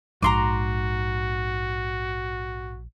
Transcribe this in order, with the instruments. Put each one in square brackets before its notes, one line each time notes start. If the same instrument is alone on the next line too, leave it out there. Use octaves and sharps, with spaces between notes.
[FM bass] A#1 [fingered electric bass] G#2 [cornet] F#4 [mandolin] A#5 C6 D6